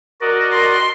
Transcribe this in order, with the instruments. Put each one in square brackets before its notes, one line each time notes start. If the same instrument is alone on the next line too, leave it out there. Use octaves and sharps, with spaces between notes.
[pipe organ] F#4 D5 D#5 [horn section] A#4
[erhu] C6